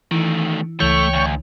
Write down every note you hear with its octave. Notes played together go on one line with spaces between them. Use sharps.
D#3 E3 A3
C#2 E3 A3 C#5 G5 C#6
D2